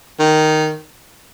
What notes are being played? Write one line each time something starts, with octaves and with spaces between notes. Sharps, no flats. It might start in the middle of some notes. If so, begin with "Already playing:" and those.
D#3